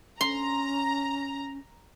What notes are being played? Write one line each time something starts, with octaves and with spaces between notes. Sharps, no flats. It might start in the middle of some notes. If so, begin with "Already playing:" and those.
C#4 A#5 C6